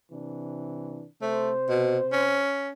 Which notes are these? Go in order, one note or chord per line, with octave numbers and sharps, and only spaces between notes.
C3 E3 D4
C3 A3 C5
B2
C#4